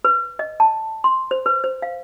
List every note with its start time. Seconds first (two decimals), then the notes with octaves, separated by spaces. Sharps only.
0.05 B4
0.39 D#5
0.60 A5
1.04 C6
1.31 C5
1.46 B4
1.64 C5
1.82 F5